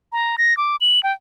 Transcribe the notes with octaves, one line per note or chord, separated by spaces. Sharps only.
A#5
A#6
D6
F#7
G5